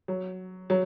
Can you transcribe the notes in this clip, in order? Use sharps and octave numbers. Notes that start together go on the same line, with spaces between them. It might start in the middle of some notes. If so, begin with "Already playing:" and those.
F#3
F#3